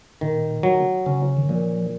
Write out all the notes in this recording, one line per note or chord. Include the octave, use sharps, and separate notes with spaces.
A#2 D#3
F#3
C#3 C#4
D#3
A#2 F3